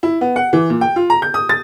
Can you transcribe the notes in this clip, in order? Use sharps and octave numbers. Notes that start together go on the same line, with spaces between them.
E4
B3
F#5
E3
A#2
G5
F4
A#5
G6
D#6
A6